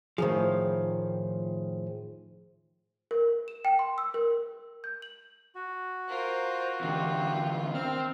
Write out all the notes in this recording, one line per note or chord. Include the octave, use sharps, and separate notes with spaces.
A2 D#3 F3 G#4 C5
A#4
E7
G5
C6
E6
A#4
G6
F#7
F#4
F4 A#4 C5
E2 D3 F4 G4
D#3 C4 F6